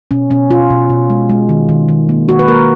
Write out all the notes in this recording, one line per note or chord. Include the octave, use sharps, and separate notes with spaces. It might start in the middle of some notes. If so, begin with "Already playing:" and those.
B2 C#4
B2 C#4
B2 F4
B2
B2
G#3
G#3
D#3
D#3
D#3
A#3
A#3 F#4
B4
A#3 A#4